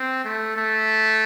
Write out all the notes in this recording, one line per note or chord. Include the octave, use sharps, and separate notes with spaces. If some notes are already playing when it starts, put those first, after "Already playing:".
Already playing: C4
A3
A3